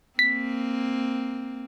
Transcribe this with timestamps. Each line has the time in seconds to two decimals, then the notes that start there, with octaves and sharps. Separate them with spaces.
0.19 A#3 C4 B6